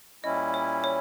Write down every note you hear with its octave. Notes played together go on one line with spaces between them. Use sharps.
A#2 G3 C#4 E4 D#5
C#5
C#5